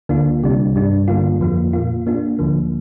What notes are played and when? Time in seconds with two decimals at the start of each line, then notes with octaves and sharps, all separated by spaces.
0.09 D2 D3 A#3 D4 F4
0.43 C2 C3 G3 D4
0.76 G2 G3 D4
1.08 G2 D3 A#3 F4
1.41 F2 F3 A#3 F4
1.73 A#2 A#3 F4
2.06 A#2 A#3 D4 F4
2.39 D2 D3 F3 A#3